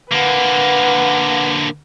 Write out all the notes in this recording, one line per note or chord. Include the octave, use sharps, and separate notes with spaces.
D3 A#3 B4 F#5